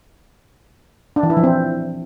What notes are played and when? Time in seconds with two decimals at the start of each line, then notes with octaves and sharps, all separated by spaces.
1.16 D4
1.23 E3
1.30 E4
1.37 F3
1.44 C4